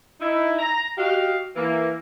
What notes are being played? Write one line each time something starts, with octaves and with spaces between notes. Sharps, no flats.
D#4 E4
A#5
F#4 G4 D#5 F5
E3 A#3